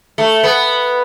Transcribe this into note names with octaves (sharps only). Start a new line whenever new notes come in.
A3
B3